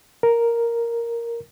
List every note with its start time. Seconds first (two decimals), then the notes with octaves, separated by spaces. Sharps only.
0.23 A#4